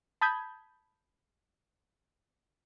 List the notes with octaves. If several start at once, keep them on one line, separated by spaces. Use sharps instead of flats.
A5 B5 D#6 G6 G#6